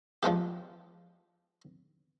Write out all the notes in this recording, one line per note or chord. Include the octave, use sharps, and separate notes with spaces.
F3 G#3 A3 G4